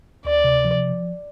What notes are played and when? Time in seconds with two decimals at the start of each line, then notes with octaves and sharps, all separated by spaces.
0.25 D2 D5
0.44 C3
0.65 F3